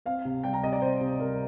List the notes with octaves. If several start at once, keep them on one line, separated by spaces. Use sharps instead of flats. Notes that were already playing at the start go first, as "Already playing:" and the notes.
C4 F5
C3
G3 G5
A#5
C3 D#5
D5
C4 C5
C3
G3 A#4